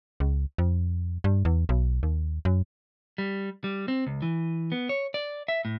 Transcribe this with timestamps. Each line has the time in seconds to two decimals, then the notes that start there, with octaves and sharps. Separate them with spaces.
0.20 C#2
0.58 F2
1.24 G2
1.45 E2
1.69 B1
2.03 D#2
2.45 F#2
3.18 G3
3.64 G3
3.88 C4
4.07 C#2
4.22 E3
4.72 B3
4.89 C#5
5.14 D5
5.48 E5
5.65 A2